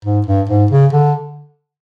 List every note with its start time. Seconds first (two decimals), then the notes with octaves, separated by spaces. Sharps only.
0.05 G#2
0.27 G2
0.50 G#2
0.71 C#3
0.93 D3